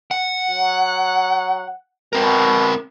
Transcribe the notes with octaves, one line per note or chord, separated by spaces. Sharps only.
F#5
F#3
B2 C4 A#4